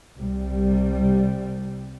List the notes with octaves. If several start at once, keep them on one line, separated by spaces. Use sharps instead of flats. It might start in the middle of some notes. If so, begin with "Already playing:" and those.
C2 C3 G3